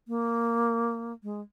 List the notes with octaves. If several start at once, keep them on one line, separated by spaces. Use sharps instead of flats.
A#3
G#3